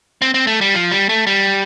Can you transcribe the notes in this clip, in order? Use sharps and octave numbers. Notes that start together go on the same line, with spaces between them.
C4
C4
A3
G3
F3
G3
A3
G3